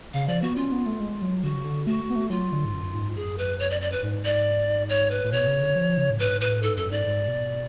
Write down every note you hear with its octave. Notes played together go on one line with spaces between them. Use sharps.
C#3 F5
F3 D5
B3 F#4
C#4 F4
B3
A3
G#3
F#3
D3 F#4
C#3
D3
A3 F#4
B3
A3
F#3 F4
D3
G#2
F#2
G#2
F#2 G#4
B4
C#5
D5
D5
B4
G#2
D5
C#5
B4
A2
B2 C#5
C#3
D3
F3
C#3
A2
G#2 B4
A2 B4
G#2 A4
F#2 A4
G#2 D5
G#2
B2